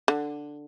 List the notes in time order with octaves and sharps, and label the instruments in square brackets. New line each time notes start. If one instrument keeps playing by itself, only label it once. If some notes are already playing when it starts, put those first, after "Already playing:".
[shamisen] D3